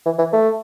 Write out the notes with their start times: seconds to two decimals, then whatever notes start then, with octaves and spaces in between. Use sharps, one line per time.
0.06 E3
0.19 E3
0.33 A3